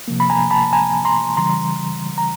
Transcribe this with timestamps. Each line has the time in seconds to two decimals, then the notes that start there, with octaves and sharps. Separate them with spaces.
0.08 C3 F3 A#3
0.20 B5
0.30 G#5 A#5
0.51 A5 B5
0.73 G#5 A#5
1.05 A#5 C6
1.37 C#3 E3 G3 A#5 C6
2.18 A#5